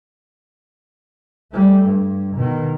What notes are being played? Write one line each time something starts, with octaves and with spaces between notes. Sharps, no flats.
G3 A3
G2
B2 D#3